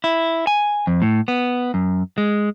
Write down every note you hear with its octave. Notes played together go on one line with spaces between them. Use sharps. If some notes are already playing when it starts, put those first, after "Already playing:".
E4
G#5
F2
A2
B3
F#2
G#3